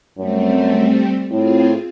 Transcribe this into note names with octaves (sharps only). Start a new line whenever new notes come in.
F#2 G3 A3 C4
A2 C4 F4 G#4